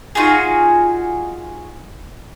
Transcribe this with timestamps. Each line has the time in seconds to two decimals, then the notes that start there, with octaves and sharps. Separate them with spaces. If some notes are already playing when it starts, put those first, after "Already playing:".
0.15 D#4 F4 F#4 G#4